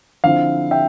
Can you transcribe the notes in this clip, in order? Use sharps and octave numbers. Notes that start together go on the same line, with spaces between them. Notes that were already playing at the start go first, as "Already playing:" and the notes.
D3 F3 C4 E4 F5
E5 G5